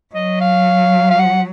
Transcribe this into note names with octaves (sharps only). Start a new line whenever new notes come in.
F#3 D#5
F5
F5
F#5